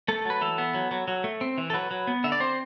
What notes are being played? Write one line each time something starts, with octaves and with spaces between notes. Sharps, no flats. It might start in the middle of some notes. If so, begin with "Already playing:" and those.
A3 A4
F#3 B4
E3 A4
B3
F#3
F#3
F#3
A3
C4
E3
A4
F#3 B4
F#3
B3
D3 E5
D5
C4 C5